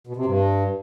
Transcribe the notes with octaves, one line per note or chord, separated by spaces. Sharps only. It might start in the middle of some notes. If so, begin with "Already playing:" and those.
B2
C3
G2